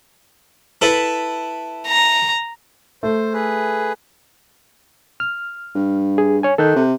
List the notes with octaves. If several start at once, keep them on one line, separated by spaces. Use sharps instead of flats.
E4 A4 B4
A#5
A3 C5
G#4 B4
F6
G2
G#4
C#5 G#5
D#3 A4 F#6 G6
C3